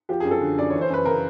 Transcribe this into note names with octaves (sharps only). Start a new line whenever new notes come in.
F3 G4
F#2 G#4
A4
D3
F#2 D5
E3 C#5
C5
F#2 B4
C#3 A#4